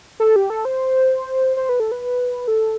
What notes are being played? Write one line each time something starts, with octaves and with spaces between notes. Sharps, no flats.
A4
G4
A4
C5
C5
B4
A4
B4
A4